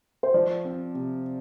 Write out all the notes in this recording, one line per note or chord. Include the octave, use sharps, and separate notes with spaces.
C5
F3 D5
C4
C3